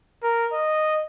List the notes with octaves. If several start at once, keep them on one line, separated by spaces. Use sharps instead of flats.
A#4
D#5